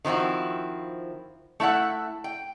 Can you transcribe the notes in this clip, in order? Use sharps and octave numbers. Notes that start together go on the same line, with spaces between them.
D#3 F3 C4 E4 F#4
A3 E4 E5 F#5
G5